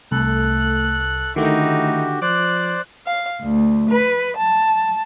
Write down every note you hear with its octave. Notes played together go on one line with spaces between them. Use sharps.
C2 A3 A4 F#6
D3 D#3 A3 D#4 E4 F#4 G4
F3 C5 D5 D6 F#6
F5
D2
B4
A5